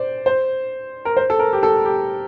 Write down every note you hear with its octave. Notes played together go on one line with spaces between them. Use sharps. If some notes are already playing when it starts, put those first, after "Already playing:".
Already playing: C5 D5
C5
A#4
C5
A4
A#4
G4
A4
G4